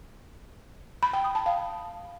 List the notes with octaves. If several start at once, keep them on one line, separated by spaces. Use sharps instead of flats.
B5
G5
D#6
A5
F5